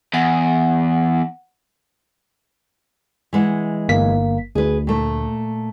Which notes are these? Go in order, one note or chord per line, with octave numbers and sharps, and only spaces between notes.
E2 F#5
E3 G#3 F#5
G1 A#3 B6
D2 G#4 B4
A#2 A3